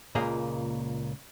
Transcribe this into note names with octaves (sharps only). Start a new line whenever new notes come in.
C#2 A#2 A#3 G#4 D#5 F5